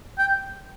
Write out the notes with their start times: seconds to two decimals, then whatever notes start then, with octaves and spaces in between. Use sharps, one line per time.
0.18 G5